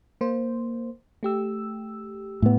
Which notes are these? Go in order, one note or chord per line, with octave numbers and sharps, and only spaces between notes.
A#3 C5
A3 G4 E6
A2 B3